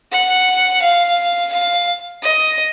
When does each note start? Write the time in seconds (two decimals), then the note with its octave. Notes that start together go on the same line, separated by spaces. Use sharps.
0.12 F#5
0.82 F5
1.52 F5
2.22 D#5